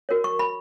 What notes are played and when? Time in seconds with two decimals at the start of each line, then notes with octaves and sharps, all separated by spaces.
0.09 F#4 A#4 C#5
0.24 C#6
0.39 B5